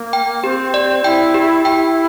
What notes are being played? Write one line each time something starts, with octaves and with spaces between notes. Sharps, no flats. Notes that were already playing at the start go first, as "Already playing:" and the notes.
Already playing: A#3
G5
C4 G4
D5
E4 G5
G4
E4 G5